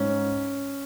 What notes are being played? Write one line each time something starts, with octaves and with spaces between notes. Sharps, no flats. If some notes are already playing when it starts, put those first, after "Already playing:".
Already playing: G#2 C#4